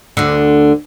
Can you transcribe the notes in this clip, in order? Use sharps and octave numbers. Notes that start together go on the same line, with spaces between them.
D2 D3